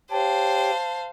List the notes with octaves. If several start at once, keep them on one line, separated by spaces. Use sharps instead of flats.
G4 C5 C#5 F5 G5 A5